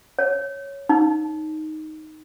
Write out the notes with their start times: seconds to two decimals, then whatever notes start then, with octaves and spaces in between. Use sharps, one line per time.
0.19 C#5
0.89 D#4